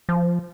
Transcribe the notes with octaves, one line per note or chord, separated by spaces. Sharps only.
F3